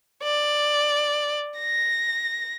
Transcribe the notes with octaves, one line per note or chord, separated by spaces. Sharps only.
D5
A#6